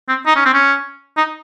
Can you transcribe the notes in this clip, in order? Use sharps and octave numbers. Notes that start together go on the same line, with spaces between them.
C4
D#4
C#4
C4
C#4
D#4